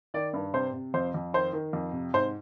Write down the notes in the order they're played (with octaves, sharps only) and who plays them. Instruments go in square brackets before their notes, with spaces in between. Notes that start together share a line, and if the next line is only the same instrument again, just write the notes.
[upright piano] D#3 D5
G2
C3 C5
C3
F2 C5
F2
D#3 C5
D#3
F2
C3
G#2 C5